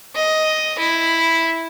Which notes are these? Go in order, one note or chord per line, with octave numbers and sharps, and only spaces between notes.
D#5
E4